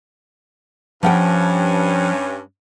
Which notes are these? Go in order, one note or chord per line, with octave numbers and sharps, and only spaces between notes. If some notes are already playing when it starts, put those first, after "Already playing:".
G2 F3 C#4 F#5 G5